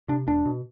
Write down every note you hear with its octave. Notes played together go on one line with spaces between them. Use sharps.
C3 D4
E1 D4
B2